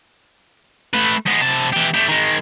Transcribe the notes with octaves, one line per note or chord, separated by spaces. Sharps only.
A3 B4
G#3 B3
C3 A5
E3 G4
A3 G4
D#3 G#3